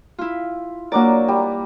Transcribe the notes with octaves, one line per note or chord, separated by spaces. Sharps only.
E4 F4
F#3 A#3 D4 A#4 D5
G3